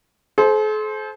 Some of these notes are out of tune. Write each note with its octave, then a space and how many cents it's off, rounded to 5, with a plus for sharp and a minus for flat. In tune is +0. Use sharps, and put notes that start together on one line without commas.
A4 -45 C5 +0